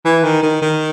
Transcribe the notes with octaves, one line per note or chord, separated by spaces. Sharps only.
E3
D#3
D#3
D#3